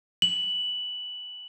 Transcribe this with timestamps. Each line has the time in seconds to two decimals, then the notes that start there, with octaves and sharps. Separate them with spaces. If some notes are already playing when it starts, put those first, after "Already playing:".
0.22 F#7